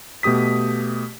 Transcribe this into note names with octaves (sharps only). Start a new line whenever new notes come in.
B2 A3 G4 D#6 B6